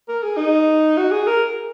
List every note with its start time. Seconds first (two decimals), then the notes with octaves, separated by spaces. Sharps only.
0.09 A#4
0.23 G#4
0.37 D#4
0.98 F#4
1.11 G#4
1.27 A#4